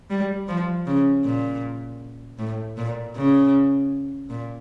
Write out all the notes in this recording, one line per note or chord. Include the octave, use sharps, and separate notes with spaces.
G3
F3
C#3
A#2
A2
A#2
C#3
A#2